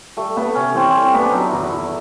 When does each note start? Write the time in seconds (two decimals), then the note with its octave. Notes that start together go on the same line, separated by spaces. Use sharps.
0.17 G3 A3
0.37 A3 B3
0.55 C3 C#4
0.75 E3 C4
0.90 G3 C4
1.04 C#4
1.14 B3
1.19 D4
1.33 F#3 D#4
1.48 E2 E4
1.63 E4
1.72 E2